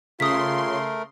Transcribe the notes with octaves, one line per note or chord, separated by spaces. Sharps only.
C#3 A3 F4 A#4 C6 D#6 B6